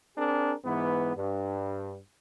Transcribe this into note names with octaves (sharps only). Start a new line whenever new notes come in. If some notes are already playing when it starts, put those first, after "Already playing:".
C4 D4 G#4 A#4
G#2 E3 B3
G2